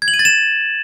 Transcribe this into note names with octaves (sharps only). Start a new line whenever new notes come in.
G#6
F#7
D#7
A6
E7